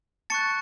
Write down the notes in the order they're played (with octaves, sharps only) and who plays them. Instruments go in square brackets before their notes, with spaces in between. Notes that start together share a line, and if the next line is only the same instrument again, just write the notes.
[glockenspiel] A5 C#6 F#6 A6 C#7